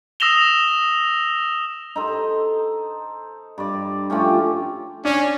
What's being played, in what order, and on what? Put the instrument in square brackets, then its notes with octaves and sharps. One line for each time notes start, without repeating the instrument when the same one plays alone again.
[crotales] D#6 E6 A#6 E7 F7 G7
[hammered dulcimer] D#4 A4 C5
G2 D5
F3 A3 C#4 G4
[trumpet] C#4 [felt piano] D4